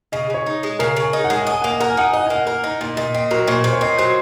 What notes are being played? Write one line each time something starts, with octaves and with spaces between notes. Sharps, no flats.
C#3 D#5
C#3 C#5
D#4
G#3
C#3 A#4
C#3
G#5
D#4
F#5
G#3 G#5
F#5
D#5
G#5
A#3 F#5
G#5
A#4 F#5
G#5
D#4 F#5
G#5
D#5 F#5
A#3 G#5
F#5
A#4
D#4
A#2 D#5
A#2 D#5
C4 D#5
F#3 A#4
A#2 C#5
A#2 C5
C#5
C4 D#5
F#3 C5